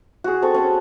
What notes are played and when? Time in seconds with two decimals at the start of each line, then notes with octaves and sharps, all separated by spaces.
0.24 F#4 G#4
0.42 C4 A4 C#6
0.54 C#4 G#4 A4